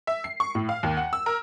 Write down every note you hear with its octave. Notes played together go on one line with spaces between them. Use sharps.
E5
C7
C#6
A2
F5
D#2
F#5
E6
A#4